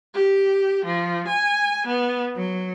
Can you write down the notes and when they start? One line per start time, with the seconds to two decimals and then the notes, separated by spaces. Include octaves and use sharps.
0.15 G4
0.86 F3
1.28 G#5
1.87 B3
2.35 F#3